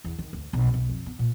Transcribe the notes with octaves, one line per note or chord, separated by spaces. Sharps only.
E2
D#3
D2
B1
B1
F2
B3
A#2